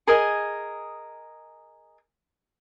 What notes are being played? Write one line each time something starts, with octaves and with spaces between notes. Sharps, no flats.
G#4 A#4 D#5 G#5